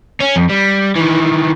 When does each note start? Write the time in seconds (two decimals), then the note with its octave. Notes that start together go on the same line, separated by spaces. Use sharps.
0.20 C#4
0.36 F2
0.50 G3
0.96 D#3 E3